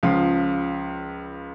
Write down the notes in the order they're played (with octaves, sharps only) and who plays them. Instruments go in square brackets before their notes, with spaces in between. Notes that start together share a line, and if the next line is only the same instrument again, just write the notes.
[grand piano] C#2 C#3 F3 F5